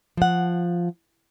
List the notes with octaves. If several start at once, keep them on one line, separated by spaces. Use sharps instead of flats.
F3 F#5